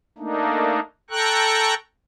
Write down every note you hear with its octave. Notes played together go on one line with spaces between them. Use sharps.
A3 A#3 D4 D#4
A4 G5 A#5 C#6 F#6